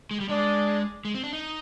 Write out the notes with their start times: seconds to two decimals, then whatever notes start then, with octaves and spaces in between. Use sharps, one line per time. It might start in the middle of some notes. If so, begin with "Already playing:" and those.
0.11 G#3
0.20 G3
0.29 G#3 D4 G#4 D5
1.05 G#3
1.14 C4
1.23 D4
1.33 D#4